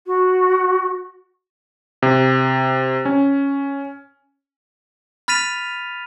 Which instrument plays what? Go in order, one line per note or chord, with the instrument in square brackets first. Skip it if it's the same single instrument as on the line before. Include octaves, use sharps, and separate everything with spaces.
[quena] F#4
[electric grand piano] C3
C#4
[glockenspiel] B5 F6 A6 B6 D#7 F7